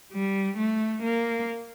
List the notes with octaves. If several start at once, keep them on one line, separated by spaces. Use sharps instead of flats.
G3
A3
A#3